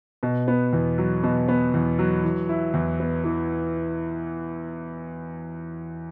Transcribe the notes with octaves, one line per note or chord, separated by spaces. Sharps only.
B2
B3
E2
F#3
B2
B3
E2
F#3
E3
E4
E2
B3
E3